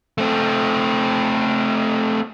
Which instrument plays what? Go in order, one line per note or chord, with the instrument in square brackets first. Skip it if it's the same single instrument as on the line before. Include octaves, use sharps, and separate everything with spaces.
[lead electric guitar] A3 C4